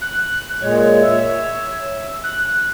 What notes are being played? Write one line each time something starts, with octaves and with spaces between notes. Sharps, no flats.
F#6
A#2 G#3 C#5
E5
F#6